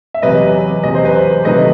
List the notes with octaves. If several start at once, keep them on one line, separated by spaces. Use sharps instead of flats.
E5
E2 C3 F#3 B4 D#5
E2 C3 F#3 D#5
C5
B4
C5
C3 D#3 F#3 A3 B4 D#5